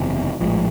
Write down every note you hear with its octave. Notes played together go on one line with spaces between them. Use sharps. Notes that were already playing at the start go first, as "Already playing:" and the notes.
Already playing: F#1 E2 C3
A#1 A2 F3 G#3